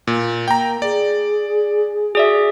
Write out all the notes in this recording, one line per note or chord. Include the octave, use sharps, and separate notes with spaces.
A#2
A#3 G5 A#5
G#4 D5
F#4 G#4 D5 E5